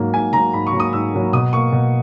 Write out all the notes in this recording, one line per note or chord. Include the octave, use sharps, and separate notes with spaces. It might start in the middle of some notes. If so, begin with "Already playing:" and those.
Already playing: G#2 F#3 A#3
G#2 G#5
F#3 A#3 A#5
G#2 B5
C#6
F#3 A#3
D#6
G#2 E6
F#3 A#3
B2 D#6
A#3 C#6
B2